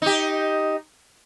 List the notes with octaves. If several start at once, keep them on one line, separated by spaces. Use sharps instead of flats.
D#4 G4